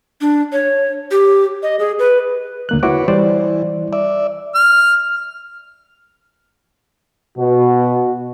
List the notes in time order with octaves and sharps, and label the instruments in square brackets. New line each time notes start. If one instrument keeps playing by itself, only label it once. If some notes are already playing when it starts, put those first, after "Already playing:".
[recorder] D4
C#5
G4
D#5
G#4
B4
[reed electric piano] D2 A#3 F#6
[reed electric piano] E4 F#4 D6 [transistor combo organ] B4 C#5
[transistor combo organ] E3 [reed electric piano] G3 C5 D5
[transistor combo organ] D5 E5
[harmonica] F6
[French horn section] B2 [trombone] F#4